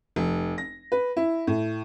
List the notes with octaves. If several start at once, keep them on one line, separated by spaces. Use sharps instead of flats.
F1
A#6
B4
E4
A2